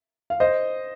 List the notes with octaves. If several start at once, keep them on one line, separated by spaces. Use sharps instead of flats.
F5
C5 D#5